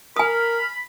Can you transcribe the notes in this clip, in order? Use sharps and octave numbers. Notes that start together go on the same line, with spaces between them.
A#4 G#5 B5 D#6 F6